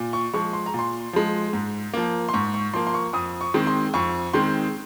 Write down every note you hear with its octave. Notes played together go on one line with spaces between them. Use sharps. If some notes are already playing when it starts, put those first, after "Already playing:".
Already playing: A#2
C#6
F3 G#3 C#6
C6
A#5
A#2
C6
F3 G#3
G#2
F3 A#3
C6
G#2 C#6
C#6
F3 A#3 C6
C6
C#6
F2 D#6
C#6
D#3 G#3 C4
C6
F2 C#6
D#3 G#3 C4 C6